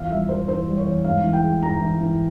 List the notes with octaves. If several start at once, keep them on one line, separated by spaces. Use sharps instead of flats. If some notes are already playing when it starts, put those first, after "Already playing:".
Already playing: E2 F3 F5
G3 E5
G3 C5
E3 C5
G3
C#5
E2
G#2 F5
E3
G5
G#3
G#2 A#5
E3
E3